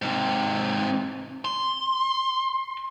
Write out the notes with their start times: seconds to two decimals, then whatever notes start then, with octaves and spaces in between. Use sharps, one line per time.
0.02 G#2 C3
1.45 C6